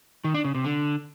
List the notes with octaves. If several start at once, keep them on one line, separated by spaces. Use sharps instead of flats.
D#3
D4
C#3
C3
D3